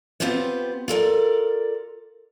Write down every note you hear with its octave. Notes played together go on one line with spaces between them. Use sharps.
B3 C4 F4 G4 C5 C#5
F4 A4 A#4 D5